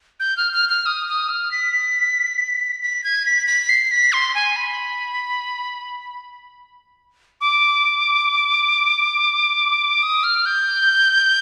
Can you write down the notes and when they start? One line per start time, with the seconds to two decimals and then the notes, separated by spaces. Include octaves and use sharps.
0.20 G6
0.37 F6
0.53 F6
0.69 F6
0.86 D#6
1.08 D#6
1.29 F6
1.51 B6
2.82 B6
3.04 G#6
3.26 B6
3.47 B6
3.69 C7
3.91 B6
4.13 C6
4.35 G#5
4.56 B5
7.41 D6
10.03 D#6
10.24 F6
10.46 G6